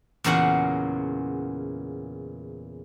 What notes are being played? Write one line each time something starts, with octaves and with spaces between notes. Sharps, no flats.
E2 A#2 C#3 F#4 F#5